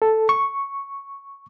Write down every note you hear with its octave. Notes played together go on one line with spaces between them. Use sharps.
A4
C#6